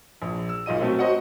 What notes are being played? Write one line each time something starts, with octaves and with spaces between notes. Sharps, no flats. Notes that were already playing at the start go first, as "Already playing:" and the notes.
A#1
E6
B1 A#2 D#5 D#7
F#3 A3 C4 C#4
F#4 C5 D#5 F#5